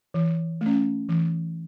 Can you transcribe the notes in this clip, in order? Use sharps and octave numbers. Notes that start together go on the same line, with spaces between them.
E3
A3
C#4
E3